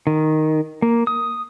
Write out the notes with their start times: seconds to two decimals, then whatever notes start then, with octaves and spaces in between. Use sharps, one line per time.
0.07 D#3
0.82 A#3
1.07 D#6